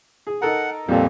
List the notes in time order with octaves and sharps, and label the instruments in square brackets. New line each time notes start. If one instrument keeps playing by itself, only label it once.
[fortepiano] G#4
[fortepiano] D#4 A4 A#4 [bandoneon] F#5
[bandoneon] F2 A#2 [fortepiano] G3 A4